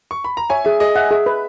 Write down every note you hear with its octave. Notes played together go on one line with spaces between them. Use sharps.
C#6
B5
A#5
C#5 E5 G#5
G#4 E5
G#4 D#5
E5 F#5
G#4 E5
B4